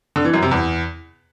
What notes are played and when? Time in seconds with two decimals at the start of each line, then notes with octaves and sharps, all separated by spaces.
0.16 D3
0.25 E3
0.34 F#2
0.42 C3
0.51 E2